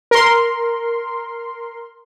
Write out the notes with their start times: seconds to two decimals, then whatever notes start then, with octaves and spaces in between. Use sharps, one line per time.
0.11 A#4 C6